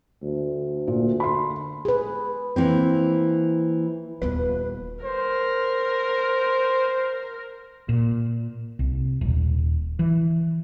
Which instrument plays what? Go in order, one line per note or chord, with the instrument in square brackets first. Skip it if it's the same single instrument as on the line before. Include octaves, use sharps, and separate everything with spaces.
[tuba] D2
[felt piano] A#2
B5 C6
[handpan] G#4 B4
[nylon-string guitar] E3 A#3 C4
[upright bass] D#1 B3 [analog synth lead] B4
[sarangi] A#4 [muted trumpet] C5
[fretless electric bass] A#2
C2
D#1
E3